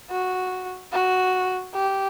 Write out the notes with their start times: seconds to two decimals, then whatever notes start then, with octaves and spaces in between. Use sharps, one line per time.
0.10 F#4
0.93 F#4
1.74 G4